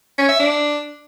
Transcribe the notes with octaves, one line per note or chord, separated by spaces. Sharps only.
C#4
E5
D4